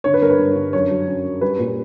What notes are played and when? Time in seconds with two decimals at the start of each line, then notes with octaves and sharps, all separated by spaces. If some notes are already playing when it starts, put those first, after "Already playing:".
0.04 D3 C#5
0.14 B4
0.22 G2 A#4
0.30 B4
0.39 G2
0.56 D3
0.73 F#2 C#5
0.91 F#3
1.08 C#4
1.25 C#4
1.41 G3 B4
1.59 A#2